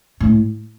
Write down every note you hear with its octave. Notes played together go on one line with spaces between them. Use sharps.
A2